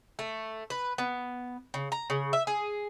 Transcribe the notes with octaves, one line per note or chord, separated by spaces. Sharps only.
A3
B4
B3
C#3
A#5
C#3
E5
G#4